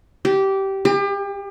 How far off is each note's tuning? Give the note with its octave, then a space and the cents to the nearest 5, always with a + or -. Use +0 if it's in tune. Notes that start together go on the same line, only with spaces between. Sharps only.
G4 -15
G4 +35